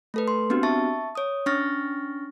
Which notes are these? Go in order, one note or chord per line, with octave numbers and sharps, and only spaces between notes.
A3 A4 B4
C6
B3 C4 D4 F#4 G4
E5 A5 C#6 A6
C#5 D#6
C#4 D4 C#6 F6 A6 A#6